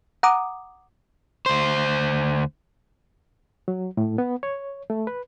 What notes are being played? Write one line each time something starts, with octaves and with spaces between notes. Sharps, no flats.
F#5 A#5 D6 D#6
D2 C5
F#3
A2
B3
C#5
A3
B4